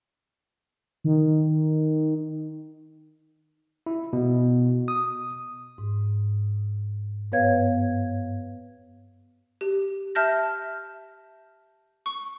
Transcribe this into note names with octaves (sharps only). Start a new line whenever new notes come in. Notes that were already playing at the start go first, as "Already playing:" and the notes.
D#3
E4
B2
D#6
G#2
G2 B3 B4 C#5 F5 G#6
G4
E5 A5 F6 G6 A#6
C#6